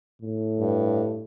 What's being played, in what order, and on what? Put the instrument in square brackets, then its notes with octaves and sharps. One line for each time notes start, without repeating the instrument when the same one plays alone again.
[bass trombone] A2
[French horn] G2